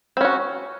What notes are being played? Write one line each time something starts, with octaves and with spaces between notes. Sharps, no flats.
C4 C#4 F#4